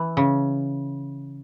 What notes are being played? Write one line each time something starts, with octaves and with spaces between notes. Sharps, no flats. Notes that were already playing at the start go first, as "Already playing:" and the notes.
Already playing: E3
C#3